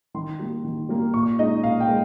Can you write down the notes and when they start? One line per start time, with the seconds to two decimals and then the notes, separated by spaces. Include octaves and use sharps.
0.14 D#3 C6
0.39 G3 A#3
0.65 D#3
0.89 G3 A#3
1.14 A#2 C#6
1.39 G#3 D#4 D#5
1.64 A#2 F5
1.80 G5
1.88 G#3